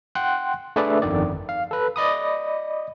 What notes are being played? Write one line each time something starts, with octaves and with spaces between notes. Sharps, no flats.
F#5 G5 C6 F#6
A3 D4 G#4 B4 D5 E5
G1 F2 D3 D#3 D5
F5
A4 B4
D5 D#5 B5 D#6